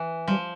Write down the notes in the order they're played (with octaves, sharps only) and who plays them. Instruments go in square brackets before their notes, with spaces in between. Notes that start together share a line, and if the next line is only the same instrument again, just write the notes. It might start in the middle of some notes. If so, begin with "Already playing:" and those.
Already playing: [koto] E3
[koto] F3 [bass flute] G3